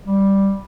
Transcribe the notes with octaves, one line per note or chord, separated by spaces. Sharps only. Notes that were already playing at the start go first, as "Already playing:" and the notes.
G3